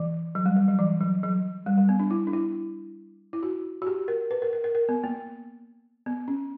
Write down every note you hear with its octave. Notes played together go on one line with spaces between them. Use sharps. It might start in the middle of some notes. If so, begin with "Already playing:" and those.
Already playing: E3
F#3
G3
G3
F#3
E3
F#3
F#3
G3
G3
B3
D4
E4
D4
E4
E4
F#4
F#4
G4
A#4
B4
A#4
A#4
A#4
A#4
B3
A#3
B3
C#4